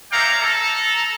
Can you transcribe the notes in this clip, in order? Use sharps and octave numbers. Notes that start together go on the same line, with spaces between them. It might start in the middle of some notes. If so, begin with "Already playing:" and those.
C#5 D5 E5 F5 G5 A#5
A4 A#5